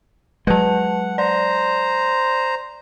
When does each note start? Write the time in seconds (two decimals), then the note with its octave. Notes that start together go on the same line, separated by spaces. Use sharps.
0.47 F#3 G#3 B4 F#5 A5
1.18 C5 D5 A#5